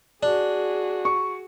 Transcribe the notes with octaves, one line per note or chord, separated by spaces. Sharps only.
D4 F#4 G#4
C#6